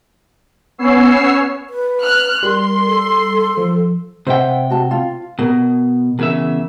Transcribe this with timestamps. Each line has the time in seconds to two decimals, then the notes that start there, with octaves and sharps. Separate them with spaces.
0.78 B3 C#4 C#5 E6 C7
1.70 B4
2.02 F6 F#6
2.43 G3 A#4 C6
2.87 A4
3.57 F3
4.27 C3 C5 E5 F#5 G5
4.70 F#4 A5
4.91 F4
5.39 B2 A#4
6.19 E2 C#3 A#4 E5